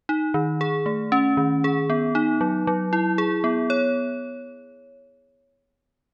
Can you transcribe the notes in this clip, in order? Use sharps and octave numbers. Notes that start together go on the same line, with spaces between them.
D#4
D#3
G#4
A3
C#4
D#3
G#4
B3
D#4
F#3
F#3
E4
G#4
B3
C#5